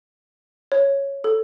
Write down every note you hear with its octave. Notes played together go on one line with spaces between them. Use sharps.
C#5
A4